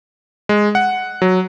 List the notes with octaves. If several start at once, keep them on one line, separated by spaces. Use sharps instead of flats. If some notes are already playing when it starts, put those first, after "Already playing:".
G#3
F#5
F#3